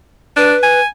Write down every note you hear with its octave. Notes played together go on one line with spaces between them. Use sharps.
D4 B4
G#5